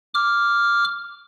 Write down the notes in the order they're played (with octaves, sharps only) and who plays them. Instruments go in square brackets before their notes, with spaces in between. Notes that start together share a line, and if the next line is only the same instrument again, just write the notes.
[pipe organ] D6 F6